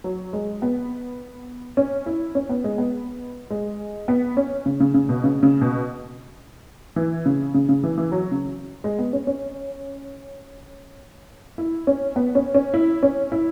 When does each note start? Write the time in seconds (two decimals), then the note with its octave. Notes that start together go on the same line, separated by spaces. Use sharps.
0.04 F#3
0.33 G#3
0.62 B3
1.77 C#4
2.06 E4
2.35 C#4
2.49 B3
2.64 G#3
2.78 B3
3.50 G#3
4.08 B3
4.37 C#4
4.66 C#3
4.80 C#3
4.94 C#3
5.09 B2
5.24 C#3
5.43 C#3
5.61 B2
6.96 E3
7.26 C#3
7.54 C#3
7.69 C#3
7.83 E3
7.98 E3
8.12 F#3
8.31 C#3
8.84 G#3
8.99 B3
9.13 C#4
9.27 C#4
11.58 E4
11.87 C#4
12.16 B3
12.35 C#4
12.54 C#4
12.74 E4
13.03 C#4
13.32 E4